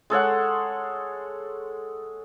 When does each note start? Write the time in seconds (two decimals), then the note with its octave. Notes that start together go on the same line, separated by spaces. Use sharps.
0.10 G#3 A4 C#5 F#5